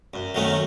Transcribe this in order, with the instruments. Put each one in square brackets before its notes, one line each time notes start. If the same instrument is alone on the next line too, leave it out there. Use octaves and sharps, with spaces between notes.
[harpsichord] F#2
D#3 F#3 A3 C#4